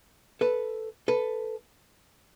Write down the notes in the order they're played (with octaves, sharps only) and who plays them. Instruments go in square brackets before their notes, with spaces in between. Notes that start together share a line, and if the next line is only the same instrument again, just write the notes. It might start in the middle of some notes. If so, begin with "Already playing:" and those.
[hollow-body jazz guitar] A4 B4
A4 B4